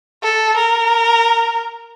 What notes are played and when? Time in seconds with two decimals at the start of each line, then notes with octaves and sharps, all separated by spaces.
0.23 A4
0.57 A#4